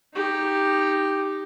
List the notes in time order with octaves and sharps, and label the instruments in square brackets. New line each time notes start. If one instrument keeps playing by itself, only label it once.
[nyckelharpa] D#4 G4